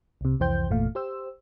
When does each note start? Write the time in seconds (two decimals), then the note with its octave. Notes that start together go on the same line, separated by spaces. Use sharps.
0.21 C2 C3
0.40 C2 F2 E3 C5 G5 G6
0.69 G1 E2 A#2 A3 F5
0.95 G4 C5 E6